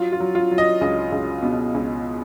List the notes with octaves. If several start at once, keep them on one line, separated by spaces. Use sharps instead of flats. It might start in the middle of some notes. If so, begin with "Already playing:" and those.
Already playing: F#3 F4
F4
F#3
F4
F#3
D#5
C#2 D#5
C#2
B2
C#2